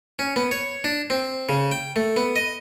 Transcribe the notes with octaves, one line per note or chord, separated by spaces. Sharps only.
C#4
B3
C#5
D4
C4
C#3
G5
A3
B3
D#5